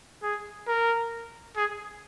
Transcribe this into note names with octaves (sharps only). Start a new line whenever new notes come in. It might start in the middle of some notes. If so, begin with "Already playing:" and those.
G#4
A#4
G#4